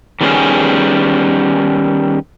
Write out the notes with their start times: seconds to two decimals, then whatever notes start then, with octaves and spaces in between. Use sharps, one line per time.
0.21 D#3 G3 B3 C#4 G#4